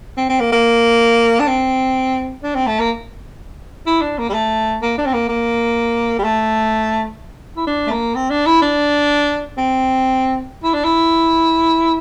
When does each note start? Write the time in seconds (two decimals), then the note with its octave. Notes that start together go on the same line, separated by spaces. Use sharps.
0.17 C4
0.29 C4
0.40 A#3
0.52 A#3
1.40 D4
1.47 C4
2.43 D4
2.55 C4
2.67 A3
2.79 A#3
3.86 E4
4.01 D4
4.18 A#3
4.29 G3
4.34 A3
4.82 A#3
4.98 D4
5.05 C4
5.13 A#3
5.29 A#3
6.19 G3
6.24 A3
7.56 E4
7.67 D4
7.87 A3
7.90 A#3
8.15 C4
8.30 D4
8.47 E4
8.62 D4
9.57 C4
10.63 E4
10.74 D4
10.84 E4